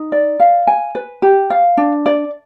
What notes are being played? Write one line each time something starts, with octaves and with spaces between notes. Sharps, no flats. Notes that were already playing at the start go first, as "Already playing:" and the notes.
Already playing: D#4
D5
F5
G#5
B4
G4
F5
D4
D5